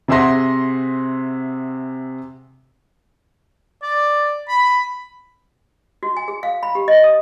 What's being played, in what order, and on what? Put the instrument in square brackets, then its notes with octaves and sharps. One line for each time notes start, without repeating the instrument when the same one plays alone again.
[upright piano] C3 G#4 E5 F#5 C6 A#6
[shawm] D5
B5
[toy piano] F#4
G#5
G#4
F5
B5
G4
D#5
D#6